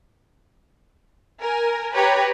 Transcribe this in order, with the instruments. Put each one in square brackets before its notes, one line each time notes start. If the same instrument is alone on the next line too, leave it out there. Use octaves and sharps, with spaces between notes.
[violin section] A#4 G#5
G4 B4 C#5 A#5